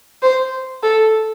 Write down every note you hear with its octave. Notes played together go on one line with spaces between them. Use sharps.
C5
A4